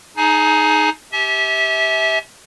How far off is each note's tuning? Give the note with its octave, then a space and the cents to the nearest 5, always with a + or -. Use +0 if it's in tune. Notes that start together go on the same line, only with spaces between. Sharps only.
D#4 +0 G#4 +20 G#5 +30
G4 +0 E5 -25 G#5 +45